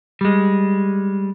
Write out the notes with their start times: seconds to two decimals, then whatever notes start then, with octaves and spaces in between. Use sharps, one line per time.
0.21 G3 G#3